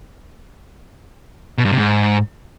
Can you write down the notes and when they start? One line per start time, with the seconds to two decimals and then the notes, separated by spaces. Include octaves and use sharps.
1.58 B2
1.65 G2
1.71 C3
1.78 G#2